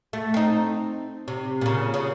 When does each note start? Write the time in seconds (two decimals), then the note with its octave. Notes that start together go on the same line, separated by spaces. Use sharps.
0.13 A3
0.34 C4 D#4
1.28 C3
1.61 A#2 C#3
1.94 C#3